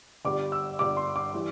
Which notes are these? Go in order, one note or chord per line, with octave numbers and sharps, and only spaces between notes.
G1 G2 G3 D6
E6
G1 G2 G3 D6
C6
D6
E3 G3